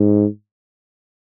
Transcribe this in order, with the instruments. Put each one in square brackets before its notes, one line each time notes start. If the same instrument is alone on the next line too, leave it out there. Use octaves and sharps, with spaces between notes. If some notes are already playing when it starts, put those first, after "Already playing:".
Already playing: [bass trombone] G#2